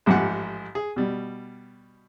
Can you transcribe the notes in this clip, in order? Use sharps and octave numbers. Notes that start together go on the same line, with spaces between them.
A1 G#2 F3 G4 F#5
G#4
B2 G3